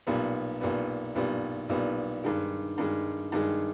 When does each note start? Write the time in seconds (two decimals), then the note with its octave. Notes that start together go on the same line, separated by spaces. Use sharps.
0.07 B1 A#2 G3 B3
0.61 B1 A#2 G3 B3
1.15 B1 A#2 G3 B3
1.69 B1 A#2 G3 B3
2.24 G2 D#3 G#3
2.78 G2 D#3 G#3
3.32 G2 D#3 G#3